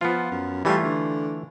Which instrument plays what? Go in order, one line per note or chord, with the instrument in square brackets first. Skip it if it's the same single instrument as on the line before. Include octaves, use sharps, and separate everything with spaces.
[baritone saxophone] F3 [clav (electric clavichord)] B3 F4
[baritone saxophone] F#2
[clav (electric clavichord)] E3 A3 F4 [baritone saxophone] G3
[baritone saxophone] D3